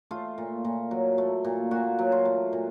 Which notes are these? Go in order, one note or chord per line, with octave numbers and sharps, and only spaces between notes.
A3 F4
A#2
A#2
F#3
A3
A#2
A#2 F#4
F#3
F4
A3
A#2